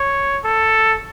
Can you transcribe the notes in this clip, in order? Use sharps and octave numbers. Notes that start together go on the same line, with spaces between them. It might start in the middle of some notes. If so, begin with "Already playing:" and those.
Already playing: C#5
A4